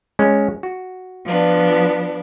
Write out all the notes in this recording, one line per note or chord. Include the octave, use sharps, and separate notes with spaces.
G#3 C#4
F#4
F3 B3 D4